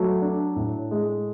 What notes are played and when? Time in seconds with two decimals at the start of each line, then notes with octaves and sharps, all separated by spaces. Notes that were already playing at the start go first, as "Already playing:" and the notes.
Already playing: F#3 A3
0.22 D4
0.56 A2
0.91 G#3